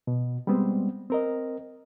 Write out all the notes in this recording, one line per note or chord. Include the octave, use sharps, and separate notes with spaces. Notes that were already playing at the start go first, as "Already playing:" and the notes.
B2
G3 G#3 B3 C4
C4 A#4 D#5